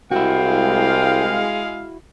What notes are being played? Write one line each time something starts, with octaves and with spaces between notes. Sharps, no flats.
C2 G#3 E4 F#4 F5 G5